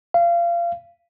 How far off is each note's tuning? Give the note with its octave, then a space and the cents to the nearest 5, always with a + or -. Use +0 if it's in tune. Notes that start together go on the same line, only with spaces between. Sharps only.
F5 -25